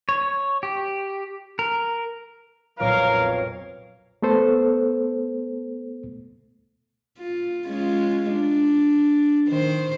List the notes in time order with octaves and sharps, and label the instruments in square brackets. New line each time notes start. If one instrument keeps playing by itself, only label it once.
[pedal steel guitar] C#5
G4
A#4
[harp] B1 F2 A#2 [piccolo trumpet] A#4 [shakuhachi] C#5 [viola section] F5
[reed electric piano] A3 B3 A4 C5
[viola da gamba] F4
G#3 C#4 F4
D4
D#3 C5